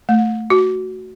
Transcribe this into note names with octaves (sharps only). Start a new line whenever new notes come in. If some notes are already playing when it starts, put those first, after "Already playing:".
A3
F#4